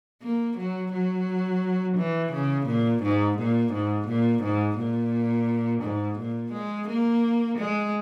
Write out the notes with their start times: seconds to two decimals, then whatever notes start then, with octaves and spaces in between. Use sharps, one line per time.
0.23 A#3
0.58 F#3
0.93 F#3
1.98 E3
2.33 C#3
2.67 A#2
3.04 G#2
3.39 A#2
3.73 G#2
4.08 A#2
4.43 G#2
4.79 A#2
5.83 G#2
6.19 A#2
6.53 G#3
6.89 A#3
7.59 G#3